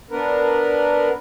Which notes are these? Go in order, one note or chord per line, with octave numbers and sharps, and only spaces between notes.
B3 D4 A#4 B4